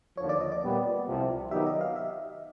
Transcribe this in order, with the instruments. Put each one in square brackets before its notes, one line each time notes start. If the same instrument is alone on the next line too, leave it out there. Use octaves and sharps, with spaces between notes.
[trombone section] D#2 D3 F3 [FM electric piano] C#5
[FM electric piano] D5
D#5
D5
[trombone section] A#2 G3 B3
C2 C3 F3
[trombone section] D#3 F#3 B3 D#4 G4 [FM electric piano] E5
[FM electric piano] D#5
F5
E5